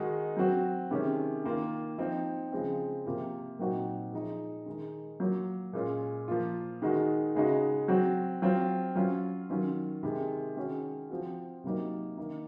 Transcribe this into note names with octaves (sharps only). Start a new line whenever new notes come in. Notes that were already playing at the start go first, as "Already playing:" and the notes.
Already playing: D#3 G#3 D#4 F#4
F#3 C4 F#4
C3 D#3 G#3 C#4
D#3 A#3 F4
F3 C4 D#4
C#3 F3 G#3 C4
C3 F3 A#3 F4
A#2 F#3 C4 D#4 F#4
F3 G#3 D#4
D#3 G#3 D#4
F#3 A#3 F4
A#2 G#3 C#4 F4
F3 A#3 F4
D#3 G#3 D#4 F#4
C#3 G#3 D#4 F#4
F#3 C4 F#4
F#3 C4 F4
F#3 C#4 F4
D#3 F#3 C#4 F4
C3 D#3 G#3
D#3 G#3 C#4 F#4
F3 C4 F#4
C3 F#3 A#3 D#4
D#3 A#3 D#4